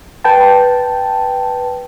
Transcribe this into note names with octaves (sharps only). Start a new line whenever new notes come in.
B4 G5 A5